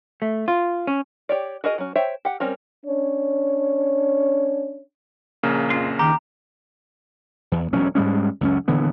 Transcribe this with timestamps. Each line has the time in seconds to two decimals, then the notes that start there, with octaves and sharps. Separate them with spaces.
0.22 A3
0.48 F4
0.87 C#4
1.29 G4 C#5 D5
1.64 F#4 G#4 A#4 D#5
1.78 F#3 C#4
1.95 C5 C#5 E5 G5
2.25 G4 F#5
2.40 G3 C4 C#4 A#4
2.85 C#4 D4 C#5
5.43 A#1 C#3 A#3
5.70 F2 F4
5.99 D#3 G4 A#5
7.52 E2
7.73 E1 F#3 C#4
7.95 G#2 G3 G#3 C#4
8.41 C#2 F#2 C#4
8.68 D#1 D3 E3 B3